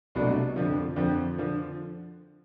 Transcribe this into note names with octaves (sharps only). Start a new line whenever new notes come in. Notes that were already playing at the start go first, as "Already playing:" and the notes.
C2 B2 F#3 A3 D4
F2 D3 F3
F2 D3 F3
D3 F3